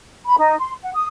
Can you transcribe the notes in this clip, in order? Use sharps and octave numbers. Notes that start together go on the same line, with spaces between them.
B5
D#4
C6
F#5
D#6